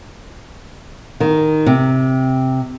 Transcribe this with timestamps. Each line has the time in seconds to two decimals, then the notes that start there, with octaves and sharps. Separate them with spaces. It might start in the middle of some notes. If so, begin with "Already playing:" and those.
1.20 D#3
1.66 C3